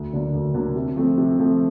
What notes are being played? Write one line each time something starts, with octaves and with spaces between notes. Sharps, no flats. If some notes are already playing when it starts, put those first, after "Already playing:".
Already playing: D2
D3 F#3 A#3 D4
D2
D3 F#3 A#3 D4
C3
F3 A3 C4
C3
F3 A3 C4